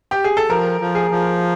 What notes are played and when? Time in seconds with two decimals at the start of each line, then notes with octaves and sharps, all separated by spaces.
0.11 G4
0.24 G#4
0.37 A4
0.50 F3 A#4
0.81 F3
0.95 G#4
1.11 F3